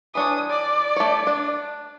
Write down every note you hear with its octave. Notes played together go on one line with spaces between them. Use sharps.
E3 D4 C#5 D#6
D5
A3 C#5
D4